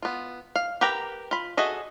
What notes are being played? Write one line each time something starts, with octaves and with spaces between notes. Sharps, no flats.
B3 F4
F5
G4 A#4 B4 G5 A#5
F4 B5
F#4 G#4 A4 D#5 E5